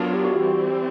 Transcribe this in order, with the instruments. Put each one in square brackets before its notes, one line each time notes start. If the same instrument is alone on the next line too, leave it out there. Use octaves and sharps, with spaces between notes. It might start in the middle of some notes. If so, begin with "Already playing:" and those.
Already playing: [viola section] F#3 B3 D4 F4 A#4
[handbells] G4
F#4
[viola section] E3 G3 C4 [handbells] G4